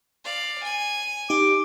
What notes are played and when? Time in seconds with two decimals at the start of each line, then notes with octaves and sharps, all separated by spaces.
0.25 D5 F5
0.63 G#5
1.30 D#4 G4 D6